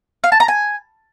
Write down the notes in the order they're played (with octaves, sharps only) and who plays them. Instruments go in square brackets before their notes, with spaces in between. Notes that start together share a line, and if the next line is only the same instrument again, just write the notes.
[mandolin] F5
A5
A#5
G#5